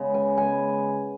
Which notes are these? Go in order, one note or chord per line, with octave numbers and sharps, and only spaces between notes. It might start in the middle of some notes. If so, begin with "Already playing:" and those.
Already playing: C#3 G#3 B3
G#5
C#3 G#3 B3 G#5